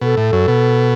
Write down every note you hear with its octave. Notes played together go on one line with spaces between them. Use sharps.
B2 A4
A2
F#2
B2